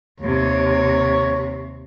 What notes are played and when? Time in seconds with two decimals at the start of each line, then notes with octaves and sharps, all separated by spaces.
0.20 D#2 C3 C#5